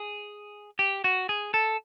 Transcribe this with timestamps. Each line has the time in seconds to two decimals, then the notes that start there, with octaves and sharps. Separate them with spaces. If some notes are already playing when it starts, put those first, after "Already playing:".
Already playing: G#4
0.79 G4
1.04 F#4
1.29 G#4
1.54 A4